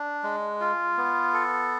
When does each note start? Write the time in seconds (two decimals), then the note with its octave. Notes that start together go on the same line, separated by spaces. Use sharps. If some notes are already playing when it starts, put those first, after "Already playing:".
Already playing: D4
0.23 G#3
0.60 F4
0.97 B3
1.34 A4